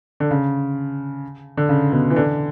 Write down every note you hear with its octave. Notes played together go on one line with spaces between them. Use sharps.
D3
C#3
D3
C#3
B2
E3
D3